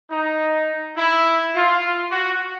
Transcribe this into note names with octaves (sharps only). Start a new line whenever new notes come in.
D#4
E4
F4
F#4